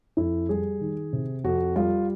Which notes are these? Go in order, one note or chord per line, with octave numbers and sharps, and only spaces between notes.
F2 E4
G3 G#4
D#3
C3
F2 F#4
G3 F4